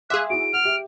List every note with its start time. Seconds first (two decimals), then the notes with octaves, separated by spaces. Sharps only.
0.10 G#4 E5 F5 C6 D6 F#6
0.30 E4 F#4 D7
0.53 F#5 F6
0.65 G4 E5